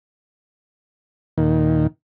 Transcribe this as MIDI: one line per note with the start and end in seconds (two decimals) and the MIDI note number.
1.38 1.87 39
1.38 1.87 46
1.38 1.87 51